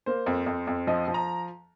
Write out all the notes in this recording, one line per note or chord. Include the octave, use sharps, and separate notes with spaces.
A#3 C5
F2
F2
F2
F3 D#5
F3
A#5